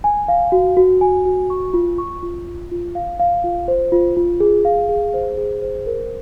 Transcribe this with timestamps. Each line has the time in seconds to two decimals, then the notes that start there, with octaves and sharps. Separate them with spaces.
0.04 G#5
0.28 F5
0.52 F#4
0.77 F#4
1.01 G#5
1.25 F#4
1.50 C#6
1.74 F4
1.98 C#6
2.23 F4
2.47 F4
2.72 F4
2.95 F5
3.20 F5
3.44 F4
3.68 C5
3.92 F4
4.17 F4
4.40 G#4
4.65 F5
4.89 G#4
5.14 C5
5.37 G#4
5.62 C5
5.86 A#4